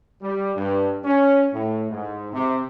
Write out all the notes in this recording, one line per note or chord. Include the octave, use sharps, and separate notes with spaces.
G3
G2
C#4
A2
G#2
C3